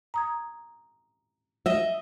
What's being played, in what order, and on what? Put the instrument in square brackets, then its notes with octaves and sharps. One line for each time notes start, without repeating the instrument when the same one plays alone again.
[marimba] A#5 D#6 G#6
[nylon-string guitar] D#5 E5